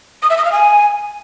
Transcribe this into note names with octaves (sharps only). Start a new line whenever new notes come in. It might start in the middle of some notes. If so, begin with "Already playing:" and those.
D#6
E5
D#6
F5
G#5